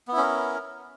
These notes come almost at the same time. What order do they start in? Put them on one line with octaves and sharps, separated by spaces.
B3 E4 C#4 A#4